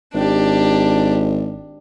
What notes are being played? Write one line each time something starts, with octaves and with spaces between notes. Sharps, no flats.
G#1 D4 G4